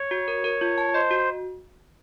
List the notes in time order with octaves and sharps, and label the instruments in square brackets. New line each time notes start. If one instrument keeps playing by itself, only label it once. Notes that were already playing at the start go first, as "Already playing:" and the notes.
Already playing: [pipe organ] C#5
[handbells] F#4
A#4
A#4
F4
A5
[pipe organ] C5 [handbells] D#5
[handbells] F#4